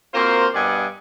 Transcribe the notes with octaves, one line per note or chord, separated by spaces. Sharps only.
A#3 C4 F4 F#4 A#4 C5
G2 B2 D5 D#5 F#5 G#5